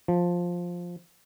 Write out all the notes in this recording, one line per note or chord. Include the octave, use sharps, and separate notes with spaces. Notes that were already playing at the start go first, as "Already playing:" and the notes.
F3